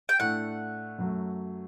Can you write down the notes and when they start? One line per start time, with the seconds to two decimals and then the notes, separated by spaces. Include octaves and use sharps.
0.09 G5
0.19 A2 A3 D4 F#5
0.98 F#2 F#3 A3